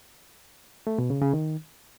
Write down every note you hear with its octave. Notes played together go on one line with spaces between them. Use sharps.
A3
B2
C#3
C#3
D#3